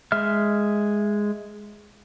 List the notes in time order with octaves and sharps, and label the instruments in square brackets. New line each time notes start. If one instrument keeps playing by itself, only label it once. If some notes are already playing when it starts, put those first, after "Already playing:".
[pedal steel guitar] G#3 E5 F6